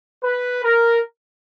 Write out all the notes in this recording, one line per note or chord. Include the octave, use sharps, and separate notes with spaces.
B4
A#4